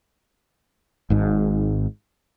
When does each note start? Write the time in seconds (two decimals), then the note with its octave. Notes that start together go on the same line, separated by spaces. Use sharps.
1.10 G#1 G#2